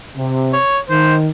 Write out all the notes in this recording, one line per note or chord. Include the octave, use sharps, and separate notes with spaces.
C3
C#5
D#3 C5